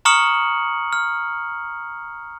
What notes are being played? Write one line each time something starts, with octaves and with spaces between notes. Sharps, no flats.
A#5 C#6 D#6 F6 C#7 F#7
F6